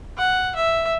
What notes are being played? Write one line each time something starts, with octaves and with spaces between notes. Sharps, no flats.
F#5
E5